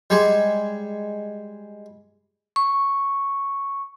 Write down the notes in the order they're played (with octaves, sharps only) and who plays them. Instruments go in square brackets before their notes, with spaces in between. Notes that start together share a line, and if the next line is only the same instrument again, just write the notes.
[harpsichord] G3 G#3
[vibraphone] C#6